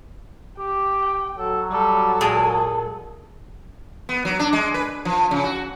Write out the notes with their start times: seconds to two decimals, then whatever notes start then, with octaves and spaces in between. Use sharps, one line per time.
0.58 G4 G5
1.38 F#3 A4
1.72 G3 A4
2.21 A#2 G#3 G#4 A#4
4.09 B3
4.25 F#3
4.39 D4
4.53 G#3
4.74 B4
5.05 F3
5.31 C#3
5.44 F#4